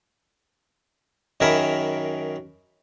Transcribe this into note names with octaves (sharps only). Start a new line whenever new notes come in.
F#2 D#3 G#4 A#4 E5 B5